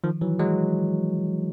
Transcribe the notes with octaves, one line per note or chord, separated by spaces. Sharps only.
D#3 F3
E3 F#3
F#3 G#3